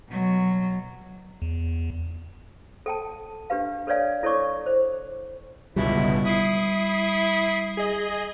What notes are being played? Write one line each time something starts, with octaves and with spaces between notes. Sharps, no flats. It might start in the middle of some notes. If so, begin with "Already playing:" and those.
B2 F#3
E2
A4 G5 A5
D4 G4 B4 F5
A4 B4 C#5 D5 F5 G#5
E4 A4 C#5 D5 C#6 D6
C5
G1 C#2 B2 G3 E4
E4 D#6 C7
G#4 D#5